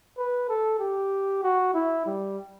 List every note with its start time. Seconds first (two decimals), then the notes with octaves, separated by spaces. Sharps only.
0.18 B4
0.49 A4
0.80 G4
1.43 F#4
1.74 E4
2.06 G3